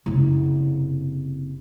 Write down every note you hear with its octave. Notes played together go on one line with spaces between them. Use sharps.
F#1 C3